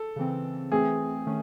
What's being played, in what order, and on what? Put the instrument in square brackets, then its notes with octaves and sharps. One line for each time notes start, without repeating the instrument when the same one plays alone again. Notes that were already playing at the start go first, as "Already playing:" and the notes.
Already playing: [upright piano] A4
[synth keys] C#3 E3 C4
[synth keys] E3 A3 C4 [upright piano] G#4
[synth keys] D#3 A3 C#4